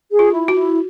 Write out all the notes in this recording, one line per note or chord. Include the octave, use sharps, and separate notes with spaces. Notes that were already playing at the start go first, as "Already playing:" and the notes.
G#4
F4
E4
F#4
E4